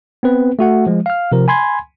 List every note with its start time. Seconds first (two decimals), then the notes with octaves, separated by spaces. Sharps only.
0.23 B3 C4 B4
0.59 A3 F#4 F#5
0.86 F3 G#3
1.06 F5 F6
1.32 C3 F3 A#4
1.48 G#5 B5 C6 G#6